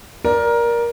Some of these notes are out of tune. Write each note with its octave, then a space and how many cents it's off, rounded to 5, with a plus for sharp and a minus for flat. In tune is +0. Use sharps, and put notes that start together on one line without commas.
A#4 +15 D5 +0